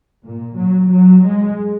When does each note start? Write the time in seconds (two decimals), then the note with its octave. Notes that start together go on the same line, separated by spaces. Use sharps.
0.24 A#2
0.57 F#3
0.90 F#3
1.23 G#3